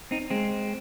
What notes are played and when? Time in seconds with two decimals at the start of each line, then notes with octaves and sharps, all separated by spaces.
0.11 C4 D#4
0.30 G#3 C4